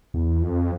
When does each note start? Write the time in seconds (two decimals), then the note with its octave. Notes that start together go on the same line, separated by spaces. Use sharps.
0.14 E2
0.42 F2